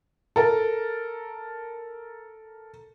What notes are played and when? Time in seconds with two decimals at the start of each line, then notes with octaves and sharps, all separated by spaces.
0.36 A4 A#4